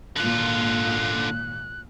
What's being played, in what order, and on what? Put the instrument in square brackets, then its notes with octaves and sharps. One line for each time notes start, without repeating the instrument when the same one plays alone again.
[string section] G#1 A#2 [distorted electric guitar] D3 F4 [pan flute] F#6